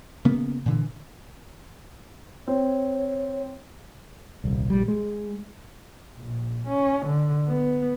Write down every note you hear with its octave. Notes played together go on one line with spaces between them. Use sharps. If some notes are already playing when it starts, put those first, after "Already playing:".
C#3 A#3 B3
A#2 D3 E3
C4 C#5
D#1 C2
A#1 G3
G#3
A#1
C#4
D3
B3